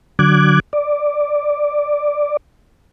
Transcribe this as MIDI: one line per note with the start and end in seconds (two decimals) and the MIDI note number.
0.19 0.60 50
0.19 0.60 54
0.19 0.60 86
0.19 0.60 90
0.19 0.60 92
0.73 2.37 74